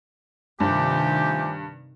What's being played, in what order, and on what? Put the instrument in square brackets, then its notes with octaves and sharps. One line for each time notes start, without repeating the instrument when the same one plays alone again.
[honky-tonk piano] G2 [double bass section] C3 D#3 [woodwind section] F3 A3 G4 [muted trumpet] G#5